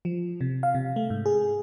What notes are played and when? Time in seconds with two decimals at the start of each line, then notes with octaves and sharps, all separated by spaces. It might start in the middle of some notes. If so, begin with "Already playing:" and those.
0.05 F3
0.41 C3
0.63 F5
0.75 C3
0.96 A3
1.10 G#2
1.26 G#4